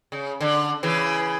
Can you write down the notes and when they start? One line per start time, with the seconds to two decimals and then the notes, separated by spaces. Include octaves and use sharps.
0.12 C#3
0.41 D3
0.83 C#3 E3